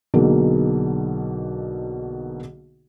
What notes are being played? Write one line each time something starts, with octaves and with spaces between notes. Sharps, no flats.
B1 B2 D3 A#3 D#4 G#4